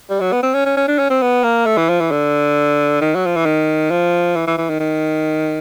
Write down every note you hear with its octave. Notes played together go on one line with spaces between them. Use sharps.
G3
F#3
B3
C4
C#4
C#4
C#4
D4
C#4
C4
B3
A#3
A3
E3
F3
E3
D3
D#3
F#3
F3
E3
D#3
F3
E3
E3
E3
D#3
D#3